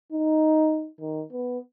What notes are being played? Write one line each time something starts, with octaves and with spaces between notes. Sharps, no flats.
D#4
D#3
B3